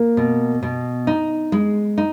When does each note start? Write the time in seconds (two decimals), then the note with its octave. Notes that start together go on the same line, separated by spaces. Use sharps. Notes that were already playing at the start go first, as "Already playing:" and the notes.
Already playing: A#3
0.17 B2
0.63 B2
1.07 D#4
1.52 G#3
1.98 D#4